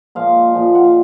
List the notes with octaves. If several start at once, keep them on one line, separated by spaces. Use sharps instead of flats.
A#2 F3 G#3 F5
A#2 F3 G#3
F#5
F5